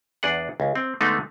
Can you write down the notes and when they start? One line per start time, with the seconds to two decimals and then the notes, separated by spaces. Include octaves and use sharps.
0.23 E2 D4 G#4 F#5
0.60 C#2
0.75 C4
1.01 D3 G#3 A3 B3 D#4